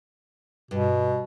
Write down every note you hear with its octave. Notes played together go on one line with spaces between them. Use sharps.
G2 B2